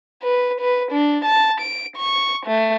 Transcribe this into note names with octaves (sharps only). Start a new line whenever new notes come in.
B4
B4
D4
A5
D7
C#6
A3